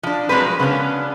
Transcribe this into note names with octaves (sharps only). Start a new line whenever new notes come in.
F3 D4
F3 F#3 G#3 C4 A#4 B4
C#3 B3 C#4 D4